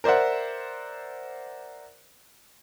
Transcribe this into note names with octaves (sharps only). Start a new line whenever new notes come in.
A#4 C5 D5 E5 F#5